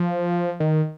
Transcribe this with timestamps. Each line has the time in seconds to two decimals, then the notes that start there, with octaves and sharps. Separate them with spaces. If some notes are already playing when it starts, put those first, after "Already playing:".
Already playing: F3
0.60 D#3